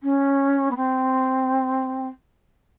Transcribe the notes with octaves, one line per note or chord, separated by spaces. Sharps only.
C#4
B3
C4